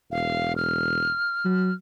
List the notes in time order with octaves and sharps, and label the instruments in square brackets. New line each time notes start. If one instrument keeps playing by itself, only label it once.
[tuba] E1 [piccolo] F5
[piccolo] F6
[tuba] F#3